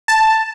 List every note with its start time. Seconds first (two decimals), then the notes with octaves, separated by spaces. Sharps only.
0.08 A5